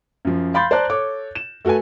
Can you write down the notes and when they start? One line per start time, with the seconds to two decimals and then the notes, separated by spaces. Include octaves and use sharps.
0.25 F#2 F3
0.54 F5 B5 C6 G6 A6
0.71 C5 D5 A5 A#5 F#6
0.89 A4 C#5 D6
1.35 E7
1.65 A3 F#4 A4 B4 G#5